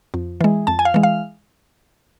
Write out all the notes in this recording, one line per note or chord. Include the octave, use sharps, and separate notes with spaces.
F2
E3 G#3
F2 A5
G#5
F5
E3 G#3
F5